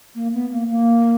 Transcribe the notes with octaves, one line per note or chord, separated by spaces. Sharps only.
A#3
B3
A#3
A#3